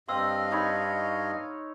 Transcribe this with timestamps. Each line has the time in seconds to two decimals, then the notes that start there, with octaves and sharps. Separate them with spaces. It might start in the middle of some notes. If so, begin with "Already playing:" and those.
0.09 G2 C4 D#5 F5 C6 E6
0.51 D#4 C#5 B5